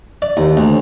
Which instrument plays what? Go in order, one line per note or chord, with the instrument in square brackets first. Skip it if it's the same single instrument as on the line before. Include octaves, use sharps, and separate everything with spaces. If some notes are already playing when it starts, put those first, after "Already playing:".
[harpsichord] D5
D#2
D2